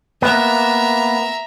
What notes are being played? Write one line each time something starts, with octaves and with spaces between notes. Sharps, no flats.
A#3 B3 E5 A#5